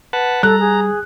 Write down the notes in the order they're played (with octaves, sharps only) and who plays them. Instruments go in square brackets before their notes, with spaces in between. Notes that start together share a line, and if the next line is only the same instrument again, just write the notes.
[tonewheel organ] B4 F#5 A5
[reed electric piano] G3 [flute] A4 [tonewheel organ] A#5 [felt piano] F#6
[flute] G#4